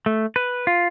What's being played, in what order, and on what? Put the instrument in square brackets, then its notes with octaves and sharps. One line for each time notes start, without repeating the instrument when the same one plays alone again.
[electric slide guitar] A3
B4
F4